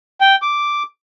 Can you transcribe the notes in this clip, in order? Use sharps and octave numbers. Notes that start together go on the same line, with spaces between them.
G5
D6